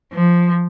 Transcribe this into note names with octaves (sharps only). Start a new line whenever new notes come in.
F3